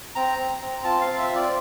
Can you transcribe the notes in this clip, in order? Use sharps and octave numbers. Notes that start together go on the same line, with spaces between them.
C4 A#5
C4
C4
F4 A5
F5
C4
E5
F4
D5